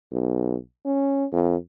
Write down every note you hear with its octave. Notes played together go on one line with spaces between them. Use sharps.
B1
C#4
F2